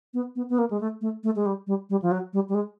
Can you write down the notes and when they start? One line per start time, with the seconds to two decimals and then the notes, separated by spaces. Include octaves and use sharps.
0.14 B3
0.36 B3
0.50 B3
0.58 A#3
0.71 G#3
0.81 A3
1.01 A3
1.24 A3
1.36 G#3
1.46 G3
1.67 G3
1.90 G3
2.02 F3
2.11 F#3
2.33 G3
2.49 G3
2.54 G#3